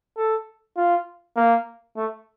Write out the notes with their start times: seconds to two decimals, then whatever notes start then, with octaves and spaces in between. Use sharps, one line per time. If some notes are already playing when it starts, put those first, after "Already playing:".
0.17 A4
0.77 F4
1.36 A#3
1.97 A3